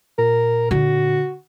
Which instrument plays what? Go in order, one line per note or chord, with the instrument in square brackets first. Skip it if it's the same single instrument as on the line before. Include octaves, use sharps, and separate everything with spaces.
[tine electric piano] A#2 [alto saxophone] A#4
[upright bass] D3 [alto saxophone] F#4